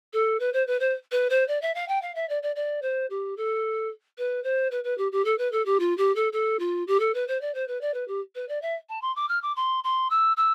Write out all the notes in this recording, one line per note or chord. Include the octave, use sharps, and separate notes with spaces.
A4
B4
C5
B4
C5
B4
C5
D5
E5
F5
G5
F5
E5
D5
D5
D5
C5
G4
A4
B4
C5
B4
B4
G4
G4
A4
B4
A4
G4
F4
G4
A4
A4
F4
G4
A4
B4
C5
D5
C5
B4
D5
B4
G4
B4
D5
E5
A5
C6
D6
F6
D6
C6
C6
E6
E6